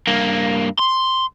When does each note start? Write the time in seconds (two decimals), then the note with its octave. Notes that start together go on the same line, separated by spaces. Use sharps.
0.07 G2 A#3
0.79 C6